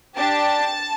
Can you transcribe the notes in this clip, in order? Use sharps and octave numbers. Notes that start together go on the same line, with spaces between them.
D4 G4 A5